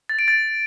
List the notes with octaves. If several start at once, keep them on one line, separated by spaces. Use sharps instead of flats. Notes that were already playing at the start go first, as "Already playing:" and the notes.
A6
D7
A6